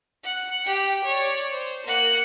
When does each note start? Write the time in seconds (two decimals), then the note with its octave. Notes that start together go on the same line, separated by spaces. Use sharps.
0.24 F#5
0.67 G4 G5
1.05 C#5 D5
1.52 C5
1.87 A#3 F#5